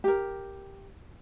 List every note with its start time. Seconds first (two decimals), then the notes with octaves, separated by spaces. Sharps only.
0.04 G4 A#4